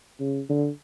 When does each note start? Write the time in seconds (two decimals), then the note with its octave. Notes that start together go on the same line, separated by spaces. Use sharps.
0.20 C#3
0.49 D3